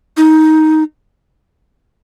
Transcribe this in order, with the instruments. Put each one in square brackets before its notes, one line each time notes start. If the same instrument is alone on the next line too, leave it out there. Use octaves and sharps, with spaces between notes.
[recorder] D#4